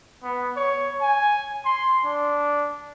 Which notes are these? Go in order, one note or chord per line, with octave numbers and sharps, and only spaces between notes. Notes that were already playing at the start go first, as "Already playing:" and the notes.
B3
C#5
G#5
C6
D4